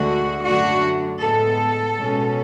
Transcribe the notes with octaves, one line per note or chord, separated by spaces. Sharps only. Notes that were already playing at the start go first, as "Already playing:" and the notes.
Already playing: D2 D3 G#3 F#4
F#2 D3 A3 D4 F#4
A2 G#3 B3 A4
B2 G#3 C#4